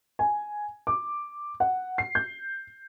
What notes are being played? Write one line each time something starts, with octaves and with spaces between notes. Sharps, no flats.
G#5
D6
F#5
C7
G6